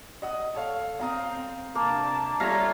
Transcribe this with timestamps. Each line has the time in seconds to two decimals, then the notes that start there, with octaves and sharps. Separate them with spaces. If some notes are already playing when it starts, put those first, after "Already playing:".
0.22 D#5 F#5 D#6
0.54 A4 C#5 F5
0.99 C4 F5 A#5 D#6
1.75 C3 A#3 D4 A5
2.40 G3 F4 A4 C#5 E5 F5 A#5 A#6